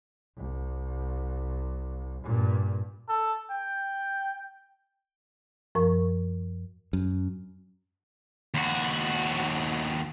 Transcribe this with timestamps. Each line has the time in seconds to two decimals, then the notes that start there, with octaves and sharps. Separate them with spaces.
0.37 C2
2.24 G2 A#2
3.08 A4
3.50 G5
5.75 F#2 F3 A#4 C#6
6.93 F#2
8.54 D#2 F#4